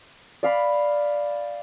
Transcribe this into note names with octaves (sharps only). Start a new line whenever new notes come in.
D5 F5 B5